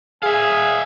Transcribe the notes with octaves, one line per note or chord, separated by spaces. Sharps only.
G#4 E5 F5 G#5